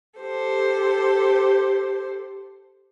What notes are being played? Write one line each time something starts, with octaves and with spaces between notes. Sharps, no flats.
G4 A4 C5